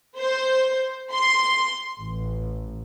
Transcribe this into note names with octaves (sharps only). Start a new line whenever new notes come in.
C5
C6
A1